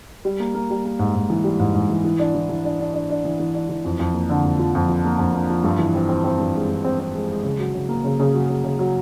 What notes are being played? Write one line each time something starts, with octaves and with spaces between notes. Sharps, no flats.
G3
A#3
A#3
G3
A#3
G#2
G#2
E3
G3
G#2
G#2
E3
E3
D4
E3
E3
D4
D4
D4
D4
E3
E3
D4
E3
F2
F2
A#3
D3
F2
F3
F2
F3
A#3
F2
A#3
F3
G2
E3
C4
C4
C4
G2
G#3
G2
C4
C4
G#3
G#3
C#3
F#3
C#3
A#3
C#3
C#3
F#3
C#3
C#3
F#3